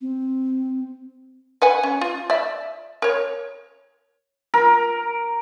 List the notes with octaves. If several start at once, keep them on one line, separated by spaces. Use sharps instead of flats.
C4
B4 F#5 G#5
C#4
F4
D5 E5
A#4 C#5
A#4